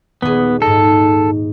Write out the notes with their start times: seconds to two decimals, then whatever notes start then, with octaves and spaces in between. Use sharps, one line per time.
0.22 D#1 B3 G#4
0.62 G#2 D#4 A4